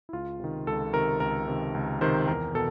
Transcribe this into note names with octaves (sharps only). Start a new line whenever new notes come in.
E4
C#2 F4
C3 D#3
C#2 A4
C3 D#3 A#4
C#2 A#4
C3 D#3
C#2
C3 D#3 C5
E2 A#4
B2 A4